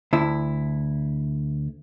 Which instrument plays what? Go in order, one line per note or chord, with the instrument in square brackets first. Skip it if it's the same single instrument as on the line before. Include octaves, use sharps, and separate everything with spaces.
[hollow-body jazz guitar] D2 E4